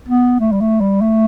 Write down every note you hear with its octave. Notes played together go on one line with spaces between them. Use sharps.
B3
A3
G3
A3
G3
A3